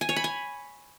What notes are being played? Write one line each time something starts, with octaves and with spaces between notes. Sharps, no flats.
G#5
C#5
B5
G#5